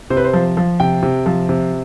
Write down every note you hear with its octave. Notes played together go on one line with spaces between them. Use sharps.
C3 C5
B4
C5
F3
F3
C3 G5
C3
F3
C3